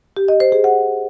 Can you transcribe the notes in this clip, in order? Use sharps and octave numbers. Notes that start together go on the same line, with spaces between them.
G4
D#5
C5
G#4
F#5